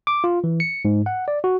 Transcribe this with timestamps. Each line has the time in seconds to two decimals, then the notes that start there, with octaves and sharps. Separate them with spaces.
0.07 D6
0.24 F4
0.44 E3
0.60 C#7
0.85 G#2
1.06 F#5
1.28 D5
1.44 F#4